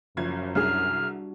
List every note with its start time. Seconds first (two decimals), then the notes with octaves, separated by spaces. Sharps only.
0.17 F#1 F#2 F3 G#6
0.55 C2 G3 D4 F#4 G#4 F6